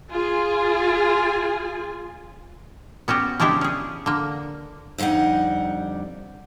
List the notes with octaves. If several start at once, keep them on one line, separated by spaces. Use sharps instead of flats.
F4 G#4 G#5
B3 C#4 F#4 G4
C#3 G#3 D4 E4 G4
C#4 G#4
D3 A#3
F2 D3 G3 D#4 F#5